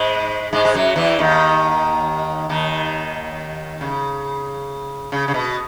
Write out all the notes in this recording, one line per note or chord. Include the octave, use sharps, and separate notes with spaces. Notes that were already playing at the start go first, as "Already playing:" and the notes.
Already playing: G#2 G#3
G#2 G#3
G#3
F#2 F#3
E2 E3
D#2 D#3
D#2 D#3
C#3
C#3
C#3
B2